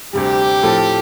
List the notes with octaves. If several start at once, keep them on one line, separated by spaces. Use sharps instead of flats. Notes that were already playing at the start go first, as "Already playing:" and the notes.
D2 C3 G3 G4
A2 F3 C4 F4 A4